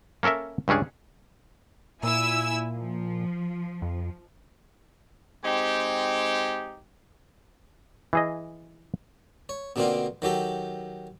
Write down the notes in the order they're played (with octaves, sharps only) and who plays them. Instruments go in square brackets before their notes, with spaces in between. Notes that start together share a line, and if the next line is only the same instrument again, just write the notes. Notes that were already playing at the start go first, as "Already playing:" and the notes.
[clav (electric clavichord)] A#3 C#4 A4 A#4 E5
C#2 G2 C#4 D4 G#4
[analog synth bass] A#2 [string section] E4 G#5 E6
[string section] F3
[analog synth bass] F2
[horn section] G#3 C4 D#4 G4
[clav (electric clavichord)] E3 G#4 D#5
[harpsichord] C#5
B2 D3 A#3 C4 D4 F4
D#3 F#3 G4 A4